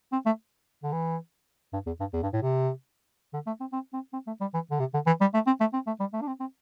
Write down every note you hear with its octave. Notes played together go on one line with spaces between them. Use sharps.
C4
A3
D3
E3
G2
E2
G2
E2
G2
A2
C3
D3
A3
C4
C4
C4
C4
A3
G3
E3
D3
C3
D3
E3
G3
A3
C4
A3
C4
A3
G3
A3
D4
C4
C4